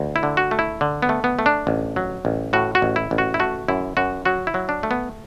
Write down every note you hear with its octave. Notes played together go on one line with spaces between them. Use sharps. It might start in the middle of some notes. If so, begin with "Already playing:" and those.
Already playing: D2
E4
D3
F#4
A3
E4
D3
B3
A3
B3
A3
D4
A1
F#3
A1
A2 F#4
F#4
A1
E4
A1
F#4
E4
A3 F#4
F#2 E4
F#2 F#4
F#3 F#4
E4
F#3
D4
A3
B3